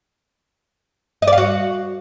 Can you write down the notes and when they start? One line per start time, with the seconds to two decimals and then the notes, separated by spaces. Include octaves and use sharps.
1.22 D#5
1.27 D5
1.32 F5
1.38 F#4